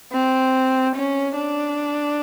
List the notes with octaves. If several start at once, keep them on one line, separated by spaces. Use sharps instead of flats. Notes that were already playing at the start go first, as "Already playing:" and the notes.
C4
C#4
D4